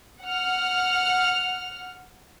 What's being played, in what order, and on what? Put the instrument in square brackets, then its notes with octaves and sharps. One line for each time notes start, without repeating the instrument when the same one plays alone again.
[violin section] F#5 F6